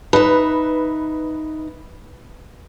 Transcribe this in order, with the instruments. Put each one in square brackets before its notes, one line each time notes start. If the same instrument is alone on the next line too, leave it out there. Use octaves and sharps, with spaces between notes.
[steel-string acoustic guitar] D#4 E5 [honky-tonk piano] B4